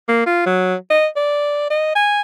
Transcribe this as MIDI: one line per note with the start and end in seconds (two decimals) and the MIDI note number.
0.08 0.24 58
0.26 0.43 65
0.46 0.75 54
0.90 1.07 75
1.16 1.70 74
1.70 1.94 75
1.95 2.21 80